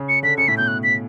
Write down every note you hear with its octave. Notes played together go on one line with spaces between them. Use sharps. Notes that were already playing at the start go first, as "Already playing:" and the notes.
Already playing: C#3
C#7
D3 B6
C#3 C#7
A2 B6
B2 G6
F#6
B6